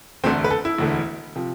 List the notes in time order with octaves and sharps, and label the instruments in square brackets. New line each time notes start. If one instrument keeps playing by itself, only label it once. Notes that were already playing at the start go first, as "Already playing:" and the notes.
[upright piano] E1 D2 D3 A3 C4
B4
A4
E4
E1 D2 D3 A3
C3 F3